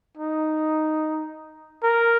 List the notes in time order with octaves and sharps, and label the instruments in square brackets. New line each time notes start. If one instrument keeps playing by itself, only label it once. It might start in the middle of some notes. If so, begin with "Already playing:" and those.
[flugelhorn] D#4
A#4